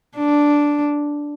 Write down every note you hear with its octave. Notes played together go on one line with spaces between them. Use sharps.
D4